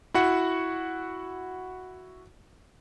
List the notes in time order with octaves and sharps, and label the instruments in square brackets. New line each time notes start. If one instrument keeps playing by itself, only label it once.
[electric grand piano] E4 F#4 F#5